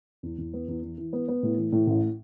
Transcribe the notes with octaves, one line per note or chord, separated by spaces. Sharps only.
E2
E2
B3
E2
E3
E3
B3
B3
A2
E3
A2
A1